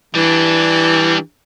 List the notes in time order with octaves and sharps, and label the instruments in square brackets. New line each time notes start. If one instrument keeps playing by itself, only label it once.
[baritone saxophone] E3 [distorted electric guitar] G3 D4